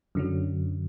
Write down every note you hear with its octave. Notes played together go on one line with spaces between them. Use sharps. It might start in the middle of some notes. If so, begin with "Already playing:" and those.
F#2 D3 F#3